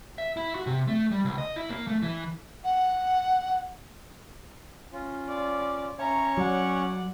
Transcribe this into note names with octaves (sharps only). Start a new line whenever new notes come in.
E5
E4
F#4
C3
A3
G3
C#2
D#5
E4
A#3
A3
E3
F#5
C#4 F4
D5
C#4 C#5 E5 A#5 C#6
F#3 D5 F#5